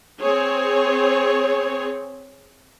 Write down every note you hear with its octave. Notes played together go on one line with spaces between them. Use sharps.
C4 G#4 C#5